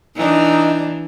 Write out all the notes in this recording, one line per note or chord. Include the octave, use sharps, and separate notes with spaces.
E3 D4 D#4